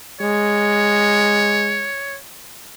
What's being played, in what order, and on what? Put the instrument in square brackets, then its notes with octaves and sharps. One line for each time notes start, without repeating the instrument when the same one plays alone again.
[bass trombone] G#3 [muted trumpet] C#5